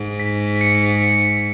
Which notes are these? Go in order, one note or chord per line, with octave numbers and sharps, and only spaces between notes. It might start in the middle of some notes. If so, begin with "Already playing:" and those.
Already playing: G#2
B6
C#7